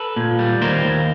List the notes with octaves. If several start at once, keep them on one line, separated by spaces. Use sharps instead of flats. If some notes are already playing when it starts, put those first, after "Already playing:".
Already playing: A4 B4
A#2
G3
D#2 A#4 C5
D#2